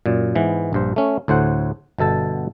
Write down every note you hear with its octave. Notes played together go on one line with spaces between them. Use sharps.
F#2 A#2
G#2 E3 B3
A#1 G2 C5
A3 C#4
D2 A2 C5 F#5
G1 B2 A4 A5